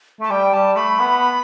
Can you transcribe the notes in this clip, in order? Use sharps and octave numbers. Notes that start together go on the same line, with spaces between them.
A3 A5
G3 G5
G3 A5
A3 B5
B3